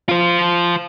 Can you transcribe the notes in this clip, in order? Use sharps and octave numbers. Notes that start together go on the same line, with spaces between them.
F4 C5